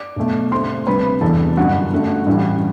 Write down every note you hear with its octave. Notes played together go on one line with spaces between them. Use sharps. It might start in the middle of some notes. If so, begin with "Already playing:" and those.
Already playing: D5 D6
B1 B2 A3
G2 D3 A3 C4 C5 C6
D2 C3 G3 D4 B4 B5
E1 E2 C3 E3 B3 A4 A5
G1 F#2 D3 G3 F#4 F#5
G2 D3 A3
A1 G2 D3 G3